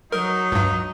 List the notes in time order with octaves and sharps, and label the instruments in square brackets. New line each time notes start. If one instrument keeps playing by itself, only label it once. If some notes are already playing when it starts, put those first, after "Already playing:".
[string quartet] F#3 [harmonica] D#4 [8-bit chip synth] A#4
[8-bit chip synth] C#2 G2